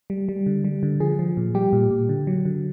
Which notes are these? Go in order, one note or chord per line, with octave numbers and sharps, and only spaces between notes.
G3
G3
D3
G3
D3
F3 G#4
F3
A#2
G3 G4
A#2
A#2
D3
F#3
D3